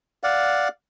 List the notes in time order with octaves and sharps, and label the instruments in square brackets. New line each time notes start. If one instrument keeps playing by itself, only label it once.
[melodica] D5 F5 F#5